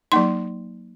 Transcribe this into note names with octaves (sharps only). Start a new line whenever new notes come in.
F#3 A#3 D#4 C6